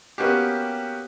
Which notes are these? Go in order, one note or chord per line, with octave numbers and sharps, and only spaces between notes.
A#3 B3 C#4 F#4 G4